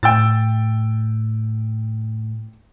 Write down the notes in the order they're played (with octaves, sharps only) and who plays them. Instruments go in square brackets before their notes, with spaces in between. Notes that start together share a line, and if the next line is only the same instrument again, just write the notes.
[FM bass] A2 [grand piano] G5 E6 A6